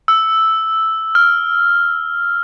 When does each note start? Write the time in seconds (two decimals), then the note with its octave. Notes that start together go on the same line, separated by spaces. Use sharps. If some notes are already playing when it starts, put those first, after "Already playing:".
0.08 E6
1.15 F6